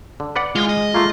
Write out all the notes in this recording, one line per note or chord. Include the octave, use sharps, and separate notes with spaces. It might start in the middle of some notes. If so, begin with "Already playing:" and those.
D3
B4 D5 F#5
G#3 F4
D#5
A3 A#3 F4